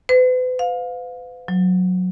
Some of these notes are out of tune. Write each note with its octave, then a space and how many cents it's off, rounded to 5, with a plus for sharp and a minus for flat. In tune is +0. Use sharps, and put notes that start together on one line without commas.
B4 +40
F5 +25
F#3 -15